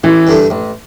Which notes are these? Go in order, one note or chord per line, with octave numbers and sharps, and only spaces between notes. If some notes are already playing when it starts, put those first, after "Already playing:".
A1 E3
G2 D3 A3
A1